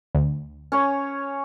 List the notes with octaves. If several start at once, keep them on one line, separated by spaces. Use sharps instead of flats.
D2
C#4 C#5